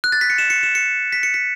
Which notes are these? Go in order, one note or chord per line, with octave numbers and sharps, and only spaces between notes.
F#6
A6
B6
C#7
E7
C#7
E7
C#7
B6
C#7
B6